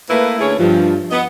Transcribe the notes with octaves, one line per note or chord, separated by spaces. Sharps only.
A3 A#3 E4 B4
D3 A3 C#4 E4 G#4 C#5
G2 F3
B3 D#5